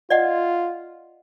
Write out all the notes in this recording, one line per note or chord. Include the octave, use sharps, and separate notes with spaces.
F4 D5 D#5 F#5